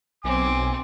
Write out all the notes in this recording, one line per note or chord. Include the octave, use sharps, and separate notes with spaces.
B1 C4 G#5 D6